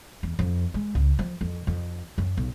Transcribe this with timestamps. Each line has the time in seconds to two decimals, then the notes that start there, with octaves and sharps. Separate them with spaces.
0.23 E2
0.39 F2
0.74 G#3
0.95 C#2
1.19 F3
1.41 F2
1.67 F2
2.18 F#2
2.37 B1